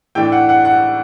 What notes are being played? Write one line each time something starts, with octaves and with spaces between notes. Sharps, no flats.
A2 E3 A3 D4 G5
F#5
F#5
F#5